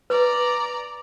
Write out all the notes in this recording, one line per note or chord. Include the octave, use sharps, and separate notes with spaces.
B4 D5 A#5